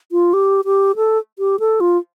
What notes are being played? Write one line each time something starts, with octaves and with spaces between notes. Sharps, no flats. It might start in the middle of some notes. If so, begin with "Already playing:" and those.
F4
G4
G4
A4
G4
A4
F4